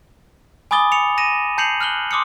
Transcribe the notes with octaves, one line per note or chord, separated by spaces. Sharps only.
G#5 B5 D6 D#6 A6 G7
C#7 F7
A#6 D#7 E7
A5 G6 C7 C#7 F7 F#7
F6 F#6 F#7 G7
C6 D6 D#6 F6 C#7